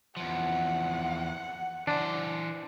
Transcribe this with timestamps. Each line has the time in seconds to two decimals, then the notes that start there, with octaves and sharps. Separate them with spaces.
0.17 E2 F3 F#5
1.87 E3 D4 C5